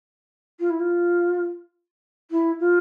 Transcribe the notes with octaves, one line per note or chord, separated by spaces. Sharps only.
F4
E4
F4
E4
F4